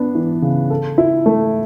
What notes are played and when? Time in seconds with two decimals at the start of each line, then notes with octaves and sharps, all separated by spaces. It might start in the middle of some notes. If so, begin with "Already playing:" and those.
Already playing: B3 D4
0.15 E3
0.42 C#3
0.70 A4
0.98 E4
1.26 A3